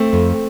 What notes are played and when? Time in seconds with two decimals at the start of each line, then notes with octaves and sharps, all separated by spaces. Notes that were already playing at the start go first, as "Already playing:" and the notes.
Already playing: A3 C4
0.13 F2